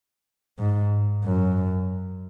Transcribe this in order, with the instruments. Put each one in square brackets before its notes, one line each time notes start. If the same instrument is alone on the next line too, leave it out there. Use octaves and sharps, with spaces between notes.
[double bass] G#2
F#2